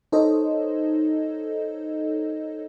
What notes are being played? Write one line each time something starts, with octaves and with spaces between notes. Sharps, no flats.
D#4 A4 C5 C#5 D#5